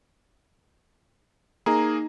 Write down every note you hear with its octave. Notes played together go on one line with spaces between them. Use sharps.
A#3 D#4 G#4 A#5